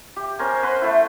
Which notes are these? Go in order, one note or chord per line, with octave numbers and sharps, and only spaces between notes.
G4
C#4 A#4 C5 G#5
B4 C5 F#5 C6
A3 E4